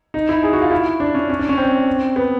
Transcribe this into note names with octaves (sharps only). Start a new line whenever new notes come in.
D#4
E4
G#4
F#4
F4
E4
D4
C#4
C#4
D4
C#4
C4
B3